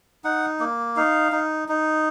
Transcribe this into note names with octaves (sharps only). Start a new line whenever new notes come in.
D#4 F#5
A#3
D#4 F5
D#4
D#4